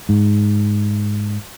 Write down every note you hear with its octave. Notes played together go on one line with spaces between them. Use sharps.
G#2